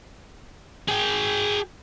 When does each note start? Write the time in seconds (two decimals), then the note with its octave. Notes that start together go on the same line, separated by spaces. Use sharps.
0.88 G#4 G5